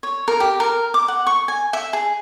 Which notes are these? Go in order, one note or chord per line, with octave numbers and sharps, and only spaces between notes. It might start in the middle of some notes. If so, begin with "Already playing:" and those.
C#5
A#4
G4
A#4
D6
F#5
C#6
G#5
E5
G#4